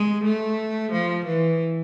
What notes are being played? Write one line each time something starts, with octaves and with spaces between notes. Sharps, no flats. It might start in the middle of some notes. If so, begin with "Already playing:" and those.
Already playing: G#3
A3
F3
E3